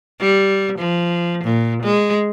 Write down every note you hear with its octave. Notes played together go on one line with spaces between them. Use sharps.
G3
F3
A#2
G#3